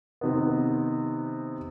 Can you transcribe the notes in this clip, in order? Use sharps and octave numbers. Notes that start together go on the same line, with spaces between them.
C3 D#3 B3